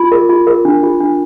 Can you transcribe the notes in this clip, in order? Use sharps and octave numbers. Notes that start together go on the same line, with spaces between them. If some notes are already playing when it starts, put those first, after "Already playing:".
Already playing: F4
A#4
F4
A#4
D4
F4
D4